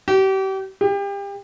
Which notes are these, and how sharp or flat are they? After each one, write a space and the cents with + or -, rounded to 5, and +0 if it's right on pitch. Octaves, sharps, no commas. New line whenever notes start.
G4 -35
G4 +30